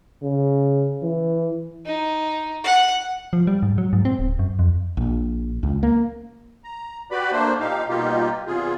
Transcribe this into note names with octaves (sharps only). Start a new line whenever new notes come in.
C#3
E3
D#4
F#5
F3
G3
G#2
F#3
G#2
C4
D1
F#2
F2
A#1
C#2
A#3
A#5
F#4 G4 B4 D5 B5
A3 A#3 D4 C5
A#2 D#4 G4 F5
B2 G3 A#3 D#4 F4 G4
E2 C3 F4 G#4